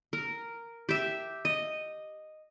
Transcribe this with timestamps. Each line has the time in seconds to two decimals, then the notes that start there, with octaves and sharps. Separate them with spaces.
0.13 A#4
0.89 G4 E5
1.45 D#5